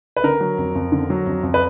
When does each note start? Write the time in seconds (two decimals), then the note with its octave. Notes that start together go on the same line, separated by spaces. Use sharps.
0.17 B4
0.24 D3 A#4
0.41 F#3
0.58 F2
0.75 F2
0.92 D3
1.10 F#3
1.26 F2
1.43 F2
1.54 B4